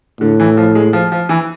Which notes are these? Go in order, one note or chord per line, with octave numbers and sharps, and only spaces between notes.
A2 D3
E3
F3
G#3
F3
F3
E3